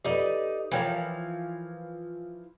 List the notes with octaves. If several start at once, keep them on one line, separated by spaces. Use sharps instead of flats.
D#4 G4 A4 B4 D5
E3 F3 A#4 C#5 G5